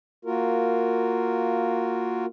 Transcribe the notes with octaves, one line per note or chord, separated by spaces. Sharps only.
A#3 F4 F#4 A#4